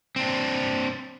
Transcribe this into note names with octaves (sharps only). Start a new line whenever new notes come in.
C4 D4